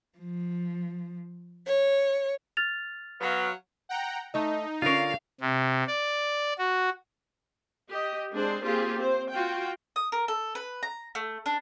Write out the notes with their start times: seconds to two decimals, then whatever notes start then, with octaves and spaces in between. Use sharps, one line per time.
0.18 F3
1.66 C#5
2.57 F6 A6 F7
3.21 F#3 B3 F5
3.89 F#5 G5 A#5
4.34 A3 D#4 D#5
4.82 D3 C#4 F4 A#4 F5
5.40 C3
5.87 D5
6.58 F#4
7.90 G4 D#5
8.32 G#3 C4 D4 G#4 C5
8.64 A#3 C4 F4 G4 G#4
8.98 C4 C5
9.31 F4 F#4 G5
9.96 D#6
10.12 A#4
10.28 A4
10.55 B4
10.83 A#5
11.15 A3
11.46 D4